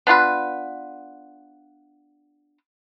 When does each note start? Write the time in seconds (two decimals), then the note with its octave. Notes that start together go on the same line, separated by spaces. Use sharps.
0.07 B3 D4 F4 B4